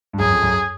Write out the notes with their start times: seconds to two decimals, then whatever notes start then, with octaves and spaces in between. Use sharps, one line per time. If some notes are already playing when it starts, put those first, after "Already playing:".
0.13 G2
0.19 F#2 G#4
0.30 F2
0.43 F#2